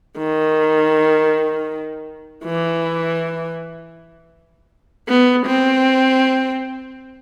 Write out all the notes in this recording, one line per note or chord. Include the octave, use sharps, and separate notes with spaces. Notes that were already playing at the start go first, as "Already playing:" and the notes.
D#3
E3
B3
C4